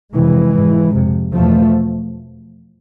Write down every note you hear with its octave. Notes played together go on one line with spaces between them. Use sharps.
F2 C3 E3 G#3
G#2
F2 C3
E2 B2 F3 A3